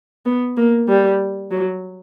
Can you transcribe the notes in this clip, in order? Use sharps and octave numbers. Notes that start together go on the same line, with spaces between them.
B3
A#3
G3
F#3